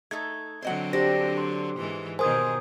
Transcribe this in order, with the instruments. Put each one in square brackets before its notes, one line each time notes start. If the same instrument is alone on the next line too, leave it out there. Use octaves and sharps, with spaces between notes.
[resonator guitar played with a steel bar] A3 D#4 A4 [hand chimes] G#6
[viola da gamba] D3 F#3 C4 [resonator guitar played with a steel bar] C5 D#5 F#5
[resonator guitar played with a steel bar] D4 [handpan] G4 C5 [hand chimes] A#6
[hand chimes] C6
[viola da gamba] G#2 E3
[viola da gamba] B2 D#3 G#4 [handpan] A#4 C5 [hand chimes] G#5 D#6 G#6